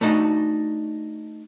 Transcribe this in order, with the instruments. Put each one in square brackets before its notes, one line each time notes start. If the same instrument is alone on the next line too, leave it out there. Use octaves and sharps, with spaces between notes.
[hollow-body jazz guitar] A3 D4 D#4 F#4